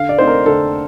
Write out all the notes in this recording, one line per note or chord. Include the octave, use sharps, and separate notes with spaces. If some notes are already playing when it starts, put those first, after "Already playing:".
Already playing: D3 F5
D5
A3 C4 D#4 C5
A#4
D3 A4